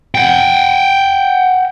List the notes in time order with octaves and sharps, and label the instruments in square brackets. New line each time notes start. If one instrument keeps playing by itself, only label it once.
[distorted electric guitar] F#5 G5